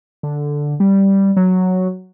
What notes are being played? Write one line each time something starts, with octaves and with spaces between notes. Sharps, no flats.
D3
G3
F#3